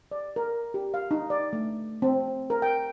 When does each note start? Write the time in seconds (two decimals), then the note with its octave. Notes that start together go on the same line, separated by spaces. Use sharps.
0.11 D5
0.36 A#4
0.74 G4
0.94 F5
1.11 D#4
1.30 D5
1.53 A3
2.02 C4
2.50 A#4
2.62 G5